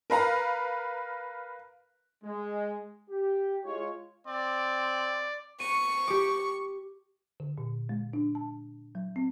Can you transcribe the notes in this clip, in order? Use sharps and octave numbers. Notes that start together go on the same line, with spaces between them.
A#4 B4 F5 A#5
G#3
G4
G#3 F4 C#5
C4 D5
C#6 D#7
G4 D6
D3
A#2
G#3
D4
A5
F#3
C4